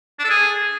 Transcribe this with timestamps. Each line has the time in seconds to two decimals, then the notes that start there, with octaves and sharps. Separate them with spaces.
0.19 D4
0.24 A4
0.30 G#4